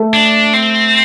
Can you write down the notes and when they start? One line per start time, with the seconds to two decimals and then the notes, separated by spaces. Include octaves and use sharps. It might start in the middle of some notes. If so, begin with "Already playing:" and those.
Already playing: A3
0.13 D4
0.53 C4